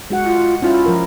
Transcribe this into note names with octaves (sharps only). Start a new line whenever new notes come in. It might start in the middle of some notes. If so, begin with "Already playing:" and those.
G#3 F#4 F#5
F4
C#4 E4 F4
F3 A#4